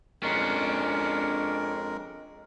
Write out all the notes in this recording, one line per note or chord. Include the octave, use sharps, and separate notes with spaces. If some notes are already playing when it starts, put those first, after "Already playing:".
F2 G#3 C#4 D4 A#4